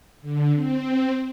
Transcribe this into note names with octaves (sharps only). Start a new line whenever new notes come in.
D3
C4